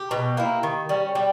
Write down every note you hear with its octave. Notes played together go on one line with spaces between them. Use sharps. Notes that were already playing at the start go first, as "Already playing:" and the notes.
Already playing: G4
B2
A#3 E4
D#3
G3 C#4
G3 G4